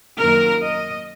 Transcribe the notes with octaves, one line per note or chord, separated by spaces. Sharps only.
F#2 D#3 A#3 A#4
D#5